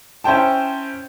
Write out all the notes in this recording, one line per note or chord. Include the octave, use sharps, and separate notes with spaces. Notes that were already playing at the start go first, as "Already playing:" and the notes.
C#4 E4 C5 G5 A5